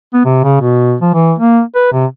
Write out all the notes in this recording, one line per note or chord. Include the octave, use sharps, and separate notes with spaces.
B3
C3
C#3
B2
F3
E3
A#3
B4
C3